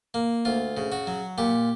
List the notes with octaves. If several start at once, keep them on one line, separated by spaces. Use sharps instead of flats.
A#3
D2 F4
C#3
F#4
F#3
A#2 G4